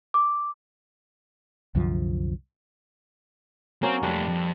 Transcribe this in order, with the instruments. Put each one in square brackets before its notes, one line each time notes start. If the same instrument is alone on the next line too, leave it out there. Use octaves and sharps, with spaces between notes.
[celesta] D6
[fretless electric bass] C2 F#2 D3 F3
[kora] F#3 A#3 C#4 [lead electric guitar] C4
[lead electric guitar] F2 A3 [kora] G3 D4
[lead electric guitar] F2